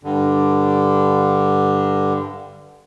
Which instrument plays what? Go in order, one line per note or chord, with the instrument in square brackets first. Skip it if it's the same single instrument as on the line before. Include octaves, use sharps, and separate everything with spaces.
[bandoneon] G2 D3